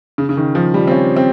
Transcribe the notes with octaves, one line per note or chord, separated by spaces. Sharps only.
C#3
C#3
D#3
F3
G3
C4
C#4
C4